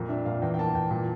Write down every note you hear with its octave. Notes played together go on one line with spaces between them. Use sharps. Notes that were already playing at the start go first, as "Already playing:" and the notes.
Already playing: F2 A#2
D4 E5
A#2 F5
E2 G5
G5
A#3 A5
E2 G5
A#2 A5